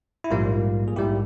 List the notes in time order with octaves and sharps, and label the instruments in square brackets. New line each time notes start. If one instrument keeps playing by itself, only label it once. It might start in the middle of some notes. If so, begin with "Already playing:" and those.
[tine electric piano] E4
A#1 G#2 G3 A#3 F4
G#4
A#1 G#2 G3 A#3 E4 G4